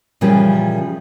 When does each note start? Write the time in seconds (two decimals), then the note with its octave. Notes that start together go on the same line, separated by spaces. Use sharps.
0.21 A#2 C#3 E3 F3 G3 A#3